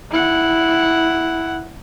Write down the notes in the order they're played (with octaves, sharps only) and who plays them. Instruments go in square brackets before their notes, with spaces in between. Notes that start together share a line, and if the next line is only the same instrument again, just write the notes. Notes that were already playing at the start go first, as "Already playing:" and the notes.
[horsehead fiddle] E4 F#5